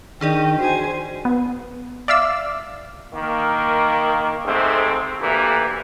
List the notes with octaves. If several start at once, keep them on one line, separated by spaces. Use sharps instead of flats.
D#3 D4 G#4 D5 D#5 G5
F#4 C5 G#5
B3
D5 E5 F5 E6
D#3 A#3
G#2 C3 A3 C4
D2 E3 A#3 G4